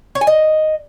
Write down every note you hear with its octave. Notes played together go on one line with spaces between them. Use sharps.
C#5
G#5
D#5